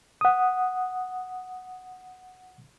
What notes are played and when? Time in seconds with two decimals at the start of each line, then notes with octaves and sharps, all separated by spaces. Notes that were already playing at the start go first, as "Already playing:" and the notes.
0.21 F#5 D#6